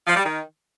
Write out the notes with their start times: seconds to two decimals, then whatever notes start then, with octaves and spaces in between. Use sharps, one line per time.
0.07 F3
0.16 G3
0.25 D#3